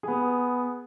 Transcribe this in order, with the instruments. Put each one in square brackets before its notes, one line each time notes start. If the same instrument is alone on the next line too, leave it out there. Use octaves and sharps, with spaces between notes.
[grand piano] B3 G#4